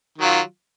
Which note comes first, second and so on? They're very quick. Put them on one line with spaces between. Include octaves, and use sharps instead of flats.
D#3 F#3 F4